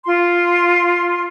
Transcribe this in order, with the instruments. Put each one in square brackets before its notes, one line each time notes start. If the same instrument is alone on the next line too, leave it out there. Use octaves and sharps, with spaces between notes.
[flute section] F4 C6